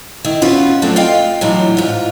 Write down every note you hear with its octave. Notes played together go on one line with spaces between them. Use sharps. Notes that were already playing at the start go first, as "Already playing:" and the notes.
D#3 E4
B3 C#4 F4 F#4 B4
F3 F#3 A3 C4 D4
F4 D#5 F5 G5
A2 E3 F#3 D4 D#4
G#2 F4